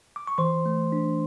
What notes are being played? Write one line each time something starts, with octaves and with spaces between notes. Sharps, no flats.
D6
C#6
E3 C5 C6
A3
D4